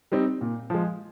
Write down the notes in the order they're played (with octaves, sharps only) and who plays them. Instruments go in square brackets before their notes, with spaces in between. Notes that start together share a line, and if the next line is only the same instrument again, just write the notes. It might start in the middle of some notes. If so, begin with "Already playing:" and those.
[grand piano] G3 C4 D#4
A#2
F3 G#3